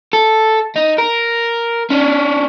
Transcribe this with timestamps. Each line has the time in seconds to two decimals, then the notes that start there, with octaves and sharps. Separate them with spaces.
0.13 A4
0.76 D#4
0.98 A#4
1.91 C#4 D4